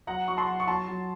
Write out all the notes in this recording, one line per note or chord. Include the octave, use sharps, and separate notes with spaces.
F#3 F#5 A#5
F#3 C#6
A5 C6
F#3
C#6
F#3 A5 C6
F#3